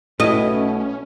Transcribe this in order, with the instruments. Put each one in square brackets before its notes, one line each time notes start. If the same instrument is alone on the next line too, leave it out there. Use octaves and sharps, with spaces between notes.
[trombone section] B1 B2 [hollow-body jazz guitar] A3 E4 [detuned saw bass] C#4 [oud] D#5